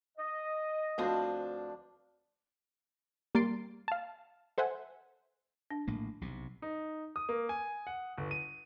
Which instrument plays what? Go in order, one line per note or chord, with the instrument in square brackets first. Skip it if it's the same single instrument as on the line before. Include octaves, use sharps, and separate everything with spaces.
[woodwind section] D#5
[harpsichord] D2 F3 C5 [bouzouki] C4 D4 B4
[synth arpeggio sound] G3 A#3 C6 A6 C7 D7
F5 A5
A4 C5 E5 F#5 G#5
[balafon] D4
[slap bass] A#1 A2 A#3
B1 C3
[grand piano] D#4
D#6
A#3
G#5
F#5
G1
D#7